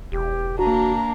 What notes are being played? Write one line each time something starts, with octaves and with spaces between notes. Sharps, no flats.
E1 G4
A#3 D4 F#4 A#5